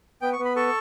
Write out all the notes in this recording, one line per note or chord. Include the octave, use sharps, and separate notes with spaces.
B3 G5
C#6
B3
B5
A4 C#6